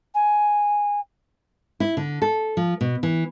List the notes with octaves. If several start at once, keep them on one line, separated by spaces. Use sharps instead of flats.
G#5
E4
D3
A4
F3
B2
E3